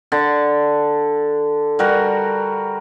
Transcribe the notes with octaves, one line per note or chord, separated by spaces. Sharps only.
D3 A5
G3 F#4 A#4